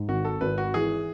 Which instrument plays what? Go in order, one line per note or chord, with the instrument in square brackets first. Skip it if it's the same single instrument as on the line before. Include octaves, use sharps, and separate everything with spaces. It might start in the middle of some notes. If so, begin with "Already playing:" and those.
Already playing: [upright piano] G#2
[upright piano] G#1 [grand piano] F#4
[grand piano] A4
[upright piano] G#1 [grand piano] B4
[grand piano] F#4
[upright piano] E3 [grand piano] G#4